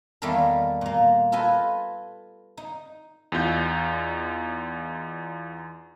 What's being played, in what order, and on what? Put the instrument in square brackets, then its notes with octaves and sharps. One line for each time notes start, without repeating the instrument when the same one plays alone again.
[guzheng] E2 D#3 G3 A#3 A4 A#4
A#2 A#3
F4 A4 B4 D#5 G#5
D#4
[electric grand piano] E2 D#4 F4 G6